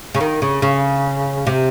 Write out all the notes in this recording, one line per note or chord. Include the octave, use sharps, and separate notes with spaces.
C#3
D#3
C#3
C#3
C3